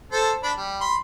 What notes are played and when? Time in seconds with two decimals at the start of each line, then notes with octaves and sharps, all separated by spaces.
0.12 A4 C5 A5
0.43 D4 B5
0.57 G3
0.81 B5 C6